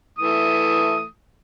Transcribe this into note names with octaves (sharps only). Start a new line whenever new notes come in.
E3 A3 D#6